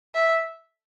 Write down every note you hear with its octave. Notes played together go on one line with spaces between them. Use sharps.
E5